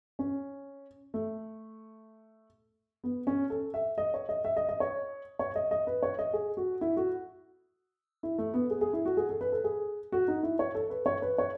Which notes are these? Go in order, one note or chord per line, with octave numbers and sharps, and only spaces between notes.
C#4
A3
B3
C#4
A4
E5
D#5
C#5
D#5
E5
D#5
D#5
C#5
C#5
D#5
D#5
B4
C#5
D#5
G#4
F#4
E4
F#4
E4
A3
B3
G#4
G#4
E4
F#4
G#4
A4
B4
A4
G#4
F#4
D#4
E4
C#5
A4
B4
C#5
B4
C#5